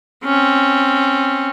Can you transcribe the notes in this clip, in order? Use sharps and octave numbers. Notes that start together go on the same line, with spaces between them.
C4 C#4